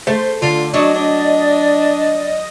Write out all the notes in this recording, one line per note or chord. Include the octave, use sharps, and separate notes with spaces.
A3 C5
D3 F4 D5
F#3 D4 F#4 D#5 C#6
D4 D5